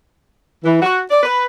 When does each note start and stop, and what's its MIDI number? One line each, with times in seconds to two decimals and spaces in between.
0.64 0.79 52
0.82 1.00 66
1.10 1.22 74
1.23 1.46 71